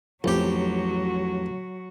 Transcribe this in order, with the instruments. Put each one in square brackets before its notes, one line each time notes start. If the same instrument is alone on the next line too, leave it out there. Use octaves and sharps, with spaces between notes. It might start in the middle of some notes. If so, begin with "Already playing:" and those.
[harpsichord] A1 G4 [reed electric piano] F2 F3 [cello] F#3 F#4